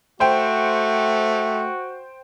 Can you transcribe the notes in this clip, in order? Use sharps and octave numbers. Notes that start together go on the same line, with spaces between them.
A3 F#4 C5 G5